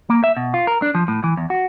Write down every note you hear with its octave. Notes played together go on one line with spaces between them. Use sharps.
A#3
E5
B2
F4
A#4
D4
F3
A2
E3
E2
F#4